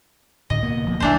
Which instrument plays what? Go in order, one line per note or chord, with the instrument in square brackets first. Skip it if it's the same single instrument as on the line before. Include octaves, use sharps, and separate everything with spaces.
[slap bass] A2 D3 [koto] D#5
[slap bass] B2 A#3 B3
D1 F3 B3
[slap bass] F1 C#2 D#3 [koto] E3 D4 C5